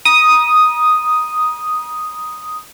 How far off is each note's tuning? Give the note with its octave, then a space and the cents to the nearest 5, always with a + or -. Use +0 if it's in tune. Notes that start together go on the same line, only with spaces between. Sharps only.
A#5 +35 D#6 +0